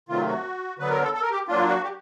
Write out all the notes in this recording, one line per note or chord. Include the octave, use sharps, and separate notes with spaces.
C3 D#3 F#3 A3 F4
F#4
D3 F#3 B3 B4
A#4
A4
A4
A#4
G4
F#3 A#3 D4 F4
F#4
G4